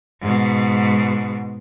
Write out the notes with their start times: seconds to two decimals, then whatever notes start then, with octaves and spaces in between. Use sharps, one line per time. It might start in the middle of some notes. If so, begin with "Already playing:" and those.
0.21 G#2 B2